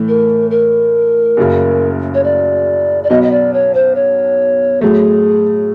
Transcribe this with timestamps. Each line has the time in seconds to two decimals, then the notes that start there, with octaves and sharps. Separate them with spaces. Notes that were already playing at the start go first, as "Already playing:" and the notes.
Already playing: A2 E3 A3
0.08 A#4
0.51 A#4
1.37 F#1 F#2 C#3
2.14 C#5
2.24 D5
3.04 D5
3.10 B1 B2 F#3 B3 D#5
3.23 D#5
3.31 D5
3.53 C#5
3.74 C5
3.95 C#5
4.81 A2 F#3 A3 G#4